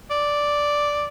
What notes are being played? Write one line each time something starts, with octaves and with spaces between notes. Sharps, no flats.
D5